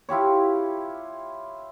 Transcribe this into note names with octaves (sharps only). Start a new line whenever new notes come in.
E4 F4 G4 C#5